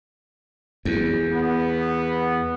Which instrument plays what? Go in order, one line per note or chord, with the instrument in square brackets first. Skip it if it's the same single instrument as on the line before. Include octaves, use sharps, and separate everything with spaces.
[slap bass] E2
[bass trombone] B3